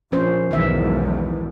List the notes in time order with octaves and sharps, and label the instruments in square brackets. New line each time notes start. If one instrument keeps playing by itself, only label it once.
[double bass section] A#1 [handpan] F3 C#4 C5
[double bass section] B1 E2 G#2 [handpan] D#3 E3 E5